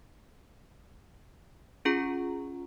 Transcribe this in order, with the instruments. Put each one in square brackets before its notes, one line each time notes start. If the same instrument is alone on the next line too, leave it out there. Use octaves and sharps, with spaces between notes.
[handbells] C#4 F4 G#4 A#5